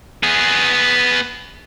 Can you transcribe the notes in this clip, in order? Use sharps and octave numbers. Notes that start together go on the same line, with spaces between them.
B3 G#4